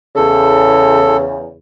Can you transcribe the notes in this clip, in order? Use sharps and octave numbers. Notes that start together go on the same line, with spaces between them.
E2 C#3 A4